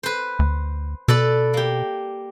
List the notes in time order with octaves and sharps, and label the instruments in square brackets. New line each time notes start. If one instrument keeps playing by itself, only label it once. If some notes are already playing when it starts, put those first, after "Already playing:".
[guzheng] B4 C5
[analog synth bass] D2
[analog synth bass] B2 [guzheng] A4 B4 D5
[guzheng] A#3 G4